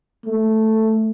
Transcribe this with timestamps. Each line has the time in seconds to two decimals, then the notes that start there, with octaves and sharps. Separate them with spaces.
0.26 A3